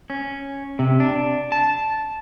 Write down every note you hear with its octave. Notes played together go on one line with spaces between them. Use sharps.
C#4
C3
D4
A5